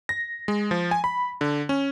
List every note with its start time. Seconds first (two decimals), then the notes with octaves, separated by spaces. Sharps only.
0.09 A#6
0.48 G#3
0.71 F3
0.91 G#5
1.04 B5
1.41 D3
1.69 C#4